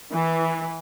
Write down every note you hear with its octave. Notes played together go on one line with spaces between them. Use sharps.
E3